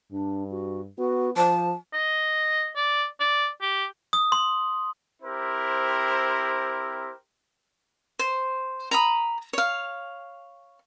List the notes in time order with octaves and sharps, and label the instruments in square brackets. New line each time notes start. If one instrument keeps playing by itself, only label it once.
[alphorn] G2 [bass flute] D4
[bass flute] F#4
[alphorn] B3 [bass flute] F#4
[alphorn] F3 [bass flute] C5 [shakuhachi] A5
[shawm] D#5
D5
D5
G4
[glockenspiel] D#6
C6
[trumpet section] C4 E4 G4 A#4 C5
[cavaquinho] C5
A#5 B5 D#6
C#5 F5